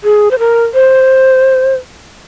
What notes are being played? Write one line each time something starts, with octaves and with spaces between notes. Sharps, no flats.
G#4
C5
A#4
C5